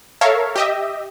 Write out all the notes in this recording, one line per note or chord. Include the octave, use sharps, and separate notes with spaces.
A4 A#4 C#5 E5 F5
G4 D#5 E5